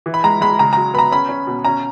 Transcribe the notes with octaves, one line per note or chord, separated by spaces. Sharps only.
E3
B5
G#3 A#5
G#3 B5
C#3 A#5
F#3 A#5
B3 A#5 B5
C#4 B5
C#4
B2
C#4 A#5